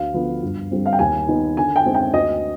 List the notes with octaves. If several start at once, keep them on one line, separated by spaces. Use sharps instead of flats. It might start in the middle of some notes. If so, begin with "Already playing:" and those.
Already playing: D2 F5
D3 F3 B3 F4
G2
D3 G3 C4
F5
G5
D#2 G#5
D#3 B3 D#4
D3 G#5
G5
G#3 C4 D#4
G5
D2 D#5